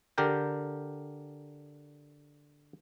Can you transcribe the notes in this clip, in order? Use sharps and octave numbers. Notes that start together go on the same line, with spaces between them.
D3 G4 A#4 G5